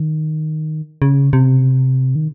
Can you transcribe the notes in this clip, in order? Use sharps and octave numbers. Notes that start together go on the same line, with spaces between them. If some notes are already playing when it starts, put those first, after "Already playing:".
Already playing: D#3
C#3
C3
D#3